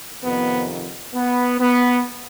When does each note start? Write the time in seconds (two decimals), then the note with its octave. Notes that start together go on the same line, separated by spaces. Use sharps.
0.24 F2 C3 D#3 B3
1.15 B3
1.60 B3